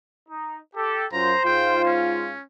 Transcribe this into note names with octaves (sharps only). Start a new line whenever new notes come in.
D#4
G4 A4
F#2 F4 C5 A#5
G#2 F4 G5
C#4